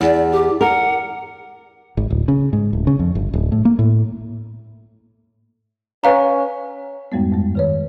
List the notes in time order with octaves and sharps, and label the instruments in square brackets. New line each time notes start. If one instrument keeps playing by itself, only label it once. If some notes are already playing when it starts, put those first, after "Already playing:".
[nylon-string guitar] E2 [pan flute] D5
[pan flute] G4
[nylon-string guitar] A#4 [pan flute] F#5
[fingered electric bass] G#1
D1
C#3
G#2
D1
C#3
F2
G1
D1
A2
A#3
A2
[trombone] C#4 [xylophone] B4 F5 A#5
[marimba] F2 G#2 G3 G#3 B3
G2 G#3
D#3 B4 C#5